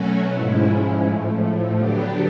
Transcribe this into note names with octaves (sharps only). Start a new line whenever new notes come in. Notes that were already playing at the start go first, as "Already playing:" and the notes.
Already playing: B2 F#3 A3 C#4 F#4
G#2 F3 G#3 C#4 E4
A2 F3 A3
D3 F#3 B3 D4 G4